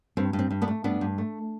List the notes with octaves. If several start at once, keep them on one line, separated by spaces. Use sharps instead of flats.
G2 C4
G2
C4
G2
B3 D4
A3
G2 B3 D4
G2
A3